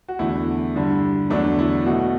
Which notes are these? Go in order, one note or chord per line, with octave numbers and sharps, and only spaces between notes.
F#4
E2 D3 A3 E4
G2 D3 G3
E2 D3 F#3 A3 D4
E4
B2 A3 F#4